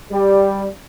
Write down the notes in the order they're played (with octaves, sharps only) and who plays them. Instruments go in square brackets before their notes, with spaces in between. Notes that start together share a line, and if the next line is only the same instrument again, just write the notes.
[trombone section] G3